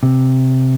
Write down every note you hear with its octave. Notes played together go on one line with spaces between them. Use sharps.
C3